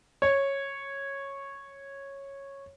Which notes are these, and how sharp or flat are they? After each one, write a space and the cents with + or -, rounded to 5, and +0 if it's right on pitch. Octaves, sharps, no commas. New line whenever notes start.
C#5 -10